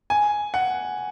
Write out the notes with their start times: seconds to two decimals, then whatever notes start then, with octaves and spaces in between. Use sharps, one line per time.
0.10 G#5
0.54 F#5